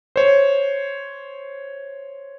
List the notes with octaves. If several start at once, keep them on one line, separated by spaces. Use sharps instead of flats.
C5 C#5